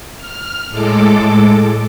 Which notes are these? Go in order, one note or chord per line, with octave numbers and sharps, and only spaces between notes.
F6
A2 G#3 A4 D6